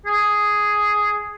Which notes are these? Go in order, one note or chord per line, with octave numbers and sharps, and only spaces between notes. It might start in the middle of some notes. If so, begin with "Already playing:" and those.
G#4